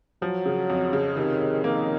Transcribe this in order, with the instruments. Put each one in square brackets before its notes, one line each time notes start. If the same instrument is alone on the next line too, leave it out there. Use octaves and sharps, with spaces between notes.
[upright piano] F3 [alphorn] F#3
[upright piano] C#3
F2
C#3
[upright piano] C3 [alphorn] D#3
[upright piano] C3
[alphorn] D#3 [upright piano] A#3